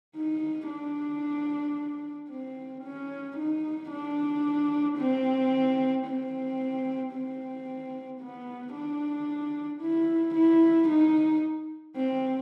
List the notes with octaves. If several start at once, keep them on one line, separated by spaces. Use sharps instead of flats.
D#4
D4
C4
C#4
D#4
D4
C4
C4
C4
B3
D4
E4
E4
D#4
C4